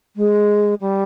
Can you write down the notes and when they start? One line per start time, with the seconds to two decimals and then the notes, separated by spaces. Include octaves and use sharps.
0.16 G#3
0.81 G3